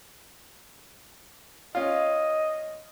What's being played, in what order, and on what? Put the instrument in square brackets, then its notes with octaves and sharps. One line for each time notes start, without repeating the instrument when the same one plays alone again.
[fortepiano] C#4 F4 [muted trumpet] D#5